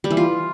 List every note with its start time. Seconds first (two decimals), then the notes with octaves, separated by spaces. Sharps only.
0.04 G3
0.11 E3
0.17 F4